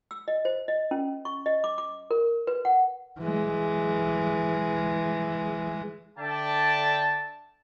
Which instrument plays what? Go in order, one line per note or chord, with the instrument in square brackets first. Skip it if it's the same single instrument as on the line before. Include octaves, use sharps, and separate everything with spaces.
[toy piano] E6
D#5
C5
D#5
C#4
C#6
D#5
D6
D6
A#4
B4
F#5
[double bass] E3 G#3
[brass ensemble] D3 D4 D5 E5 G5 A5